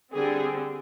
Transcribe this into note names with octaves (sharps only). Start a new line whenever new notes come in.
D3 G3 C4 G#4